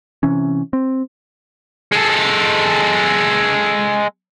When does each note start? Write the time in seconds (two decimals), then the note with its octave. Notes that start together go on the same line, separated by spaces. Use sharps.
0.23 C3 E3 C#4
0.73 C4
1.92 G#3 A4